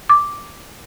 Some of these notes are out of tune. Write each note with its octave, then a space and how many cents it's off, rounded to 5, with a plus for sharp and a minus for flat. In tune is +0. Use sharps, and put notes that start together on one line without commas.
D6 -5